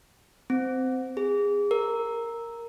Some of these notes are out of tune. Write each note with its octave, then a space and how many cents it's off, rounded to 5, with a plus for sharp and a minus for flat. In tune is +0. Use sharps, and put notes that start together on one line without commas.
C4 -15
G#4 -25
A#4 -5